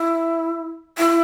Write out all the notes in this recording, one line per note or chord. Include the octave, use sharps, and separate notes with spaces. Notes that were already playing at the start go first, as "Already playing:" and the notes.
Already playing: E4
E4